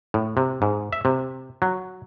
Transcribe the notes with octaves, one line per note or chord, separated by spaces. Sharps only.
A2
C3
G#2
E5
C3
F#3